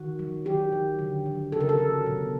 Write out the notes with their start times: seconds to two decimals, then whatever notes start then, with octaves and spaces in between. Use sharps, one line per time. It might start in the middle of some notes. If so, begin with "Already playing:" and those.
Already playing: D#3 F#4
0.19 F#3
0.45 D#3 G4
0.72 F#3
0.99 D3
1.26 F#3
1.52 C#3 A4
1.61 A#4
1.69 A4
1.79 F#3
2.06 B2